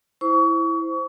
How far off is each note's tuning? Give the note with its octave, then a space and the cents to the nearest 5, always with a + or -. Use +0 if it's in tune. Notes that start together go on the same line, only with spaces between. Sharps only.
E4 +0 C5 +0 C#6 +35